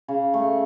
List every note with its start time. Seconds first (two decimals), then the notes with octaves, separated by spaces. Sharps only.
0.08 C#3
0.34 A3